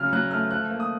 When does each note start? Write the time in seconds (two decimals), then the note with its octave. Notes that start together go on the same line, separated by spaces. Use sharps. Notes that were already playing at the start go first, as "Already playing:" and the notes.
Already playing: C#3 F#3 F6
0.13 F#3 F#6
0.31 A3 F6
0.50 F3 F#6
0.70 A#3
0.80 D#6